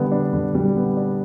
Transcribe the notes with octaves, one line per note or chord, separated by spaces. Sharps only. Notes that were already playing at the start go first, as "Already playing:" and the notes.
Already playing: D3 G3 B3
D4
D3
G3
B3
D4